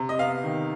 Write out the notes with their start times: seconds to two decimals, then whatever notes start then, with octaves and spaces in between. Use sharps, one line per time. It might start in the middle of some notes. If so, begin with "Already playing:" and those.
Already playing: C3
0.09 D#5
0.19 B3 F5
0.44 D#3